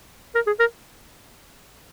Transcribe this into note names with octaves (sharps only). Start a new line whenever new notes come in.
A#4
G#4
A#4